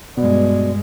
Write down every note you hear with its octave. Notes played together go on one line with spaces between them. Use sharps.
G2 B2 G#3 D5